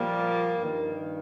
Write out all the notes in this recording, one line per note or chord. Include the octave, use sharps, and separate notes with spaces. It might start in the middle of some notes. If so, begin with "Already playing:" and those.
Already playing: A#2 F3 G3 A#3
G2 D#3